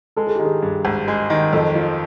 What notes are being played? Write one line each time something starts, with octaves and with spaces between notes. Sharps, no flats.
G#3 A4
G#4
D#3 G4
G#4
G2
G#1
G#3
D#3
F2 A4
F3